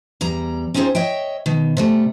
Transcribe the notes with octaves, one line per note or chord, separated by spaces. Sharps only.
E2 G3 A#5
C4 C#4 D#4 F4 G#4 C5
C#5 D#5 E5 G5
B2 D#3
C3 G3 A3